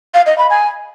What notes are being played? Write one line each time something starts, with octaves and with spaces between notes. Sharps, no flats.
F5
D#5
B5
G#5